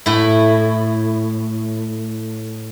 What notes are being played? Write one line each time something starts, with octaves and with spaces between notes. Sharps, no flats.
A2 E4